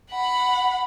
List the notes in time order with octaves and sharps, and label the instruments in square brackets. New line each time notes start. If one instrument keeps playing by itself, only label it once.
[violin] F#5 B5